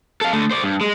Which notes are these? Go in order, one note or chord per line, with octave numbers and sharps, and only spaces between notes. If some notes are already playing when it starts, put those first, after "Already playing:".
A4 F5
D3 A3
C5 D5
G2
G#3